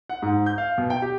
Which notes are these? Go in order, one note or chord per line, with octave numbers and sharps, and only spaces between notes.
F#5
G#2
G6
F5
B2
G5
G4